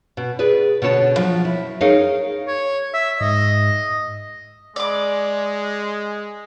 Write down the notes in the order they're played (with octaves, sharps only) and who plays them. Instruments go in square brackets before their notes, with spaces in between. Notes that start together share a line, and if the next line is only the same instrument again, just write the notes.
[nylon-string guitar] B2
G#4 B4 D5
B2 D3 C#5 D5 A5
F3 F#3
E4
D#4 G#4 A#4 C#5 D#5 F5
[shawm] C#5
E5
[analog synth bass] G#2 [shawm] D#5
[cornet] G#3 [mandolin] D5 D6